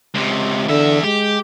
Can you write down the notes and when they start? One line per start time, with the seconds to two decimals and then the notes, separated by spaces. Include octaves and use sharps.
0.14 C#2 C3
0.68 E2 D3 E5
1.04 G#3 G4